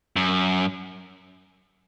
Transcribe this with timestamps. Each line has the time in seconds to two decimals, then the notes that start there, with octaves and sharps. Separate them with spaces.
0.16 F#2